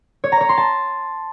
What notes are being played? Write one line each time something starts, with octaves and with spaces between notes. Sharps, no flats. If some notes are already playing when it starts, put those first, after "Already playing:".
C#5
A#5
C#5
C6
A5